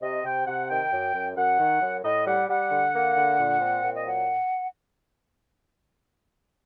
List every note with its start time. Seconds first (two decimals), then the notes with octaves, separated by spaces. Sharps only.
0.02 C3 D#5
0.25 C3 G5
0.46 C3 F#5
0.69 D#3 G5
0.92 F#2
1.14 F#2
1.36 F#2 F#5
1.59 D#3
1.81 F#2
2.04 A2 D#5
2.27 G3 F#5
2.49 G3 F#5
2.71 D3
2.94 A#3
3.17 D3
3.39 A#2
3.61 C4
3.84 A#2
3.95 D#5
4.06 F#3 F#5